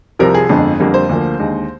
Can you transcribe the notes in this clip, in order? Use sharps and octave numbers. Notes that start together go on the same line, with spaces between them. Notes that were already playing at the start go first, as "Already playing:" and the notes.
C2 C3 F3 A#4
G#4
G1 F2 D3 G#3
F2 D3 G3 A#3
C5
D2 D3 F3 A#3
D#2 D3 G#3